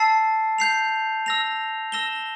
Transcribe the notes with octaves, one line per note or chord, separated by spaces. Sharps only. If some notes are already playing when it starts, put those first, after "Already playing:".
Already playing: A5 E6 A6 C7
G6 C7 F7
E6 A#6 F7
E6 A#6 E7 G7